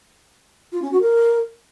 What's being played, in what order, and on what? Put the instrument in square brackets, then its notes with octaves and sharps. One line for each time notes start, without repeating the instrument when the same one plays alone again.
[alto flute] F4
C#4
F#4
A#4